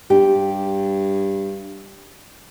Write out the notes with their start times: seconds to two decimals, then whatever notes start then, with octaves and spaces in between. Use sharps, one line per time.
0.10 G2 G4